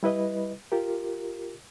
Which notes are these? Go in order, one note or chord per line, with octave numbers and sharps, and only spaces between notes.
G3 E4 B4 D#5
F4 G4 A#4